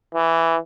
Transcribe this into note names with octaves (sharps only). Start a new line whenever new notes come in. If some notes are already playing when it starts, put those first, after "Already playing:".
E3